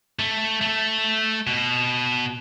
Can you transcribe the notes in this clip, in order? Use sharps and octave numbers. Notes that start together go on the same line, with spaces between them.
A3
A3
B2